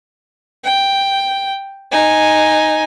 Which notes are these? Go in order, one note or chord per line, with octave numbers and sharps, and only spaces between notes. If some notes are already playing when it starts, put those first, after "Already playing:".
G5
D#4 G#5